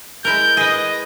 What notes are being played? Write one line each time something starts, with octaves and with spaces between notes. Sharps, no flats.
G#3 E4 A#4 G6
G#4 B4 D#5